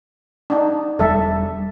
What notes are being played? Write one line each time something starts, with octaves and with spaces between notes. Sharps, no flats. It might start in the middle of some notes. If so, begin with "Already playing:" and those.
D4 D#4
E1 G3 A4 E5